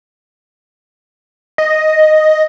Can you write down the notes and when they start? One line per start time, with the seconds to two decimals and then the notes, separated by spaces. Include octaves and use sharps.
1.58 D#5